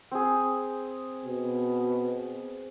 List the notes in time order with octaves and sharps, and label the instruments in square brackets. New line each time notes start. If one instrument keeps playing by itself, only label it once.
[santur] C4 G#4
[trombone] B2